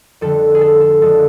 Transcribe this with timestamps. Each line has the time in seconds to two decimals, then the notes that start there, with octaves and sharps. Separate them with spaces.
0.21 F2 D3 G3 A4
0.55 G#4
0.61 A4
0.81 A4
1.01 F2 D3 F3 G#3 A4